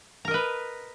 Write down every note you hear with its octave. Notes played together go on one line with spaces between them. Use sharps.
A#4 B4 D#5 A#5